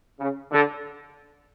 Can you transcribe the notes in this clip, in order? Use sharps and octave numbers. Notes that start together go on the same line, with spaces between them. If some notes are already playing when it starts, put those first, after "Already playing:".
C#3
D3